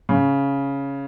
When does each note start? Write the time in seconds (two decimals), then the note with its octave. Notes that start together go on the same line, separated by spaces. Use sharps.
0.09 C#3